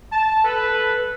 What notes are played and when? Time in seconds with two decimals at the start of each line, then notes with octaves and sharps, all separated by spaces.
0.12 A5
0.45 A4 B4